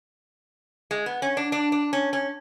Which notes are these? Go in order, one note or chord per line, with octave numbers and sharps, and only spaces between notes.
G#3
B3
C#4
D4
D4
D4
C#4
C#4